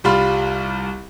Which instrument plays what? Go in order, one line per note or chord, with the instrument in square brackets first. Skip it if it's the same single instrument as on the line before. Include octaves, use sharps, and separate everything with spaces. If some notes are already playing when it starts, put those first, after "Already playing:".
[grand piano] C2 G3 F4 B5